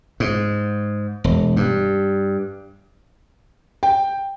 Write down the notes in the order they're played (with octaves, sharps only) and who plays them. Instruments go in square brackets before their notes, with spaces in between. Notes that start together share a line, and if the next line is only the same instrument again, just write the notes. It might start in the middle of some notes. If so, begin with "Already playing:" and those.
[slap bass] G#2
E1
G2
[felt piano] G5